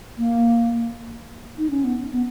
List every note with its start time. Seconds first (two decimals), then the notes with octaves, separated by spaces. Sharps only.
0.18 A#3
1.58 D#4
1.70 C#4
1.84 B3
2.12 B3